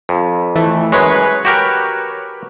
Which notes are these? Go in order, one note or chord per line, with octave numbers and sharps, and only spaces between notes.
F2
E3 A3
F#2 G#3 B4 C#5
F#4 G4 A#4